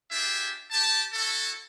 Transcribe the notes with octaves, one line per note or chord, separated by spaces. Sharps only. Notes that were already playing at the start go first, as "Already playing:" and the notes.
D4 F4 G4 G#4 E5
G4 A5
E4 F#4 A4